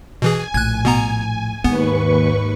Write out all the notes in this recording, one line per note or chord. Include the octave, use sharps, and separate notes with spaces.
B2 E3 G#4 G#5
A#1 A2 F#6 G#6
B2 B3 A#5
D#2 G#2 B3 B4 C#6